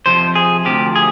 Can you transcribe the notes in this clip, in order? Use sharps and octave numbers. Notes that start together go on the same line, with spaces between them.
F2 C3 F3 C5
G#4
D2 C3 F3 G4
G#4